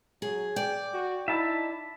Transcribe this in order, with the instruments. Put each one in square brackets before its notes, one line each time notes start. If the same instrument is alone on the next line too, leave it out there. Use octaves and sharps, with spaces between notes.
[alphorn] F#3 [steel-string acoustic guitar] G#4
[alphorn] G#4 [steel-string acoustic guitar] D5 [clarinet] G5
[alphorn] F#4
[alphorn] D#4 [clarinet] E4 [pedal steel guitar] E5 A5